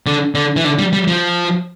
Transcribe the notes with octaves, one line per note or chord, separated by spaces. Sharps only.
D3
D3
E3
D3
G3
G3
F3